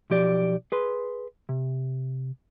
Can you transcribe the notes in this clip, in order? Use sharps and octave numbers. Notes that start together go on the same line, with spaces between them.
B1 F3 G4 D5
G#4 B4 C6
C3